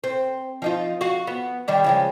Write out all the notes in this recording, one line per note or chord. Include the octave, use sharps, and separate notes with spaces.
C4
F3 D#4 F4
F#4 F5
B3
D#3 G3 D4
C#3 F3 G#3